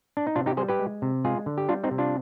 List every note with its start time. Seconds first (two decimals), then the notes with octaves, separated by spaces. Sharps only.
0.17 D4
0.27 D#4
0.36 C3 D4 F4
0.46 D#4 G4
0.57 G3 G#4 C5
0.69 G4 B4
0.79 G#3
1.02 C3
1.24 G#3 F4 G#4
1.46 D3
1.58 G4
1.69 G3 D4 F4
1.84 C4 D#4
1.91 C3
1.98 D4 F4